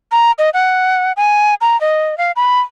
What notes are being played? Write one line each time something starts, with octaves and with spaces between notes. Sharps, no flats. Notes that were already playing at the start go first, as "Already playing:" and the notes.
A#5
D#5
F#5
G#5
A#5
D#5
F5
B5